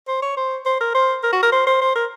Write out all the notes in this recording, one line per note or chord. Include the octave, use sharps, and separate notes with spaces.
C5
C#5
C5
C5
A#4
C5
A#4
F#4
A#4
C5
C5
C5
A#4